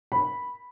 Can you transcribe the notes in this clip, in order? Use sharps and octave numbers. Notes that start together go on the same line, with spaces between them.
B5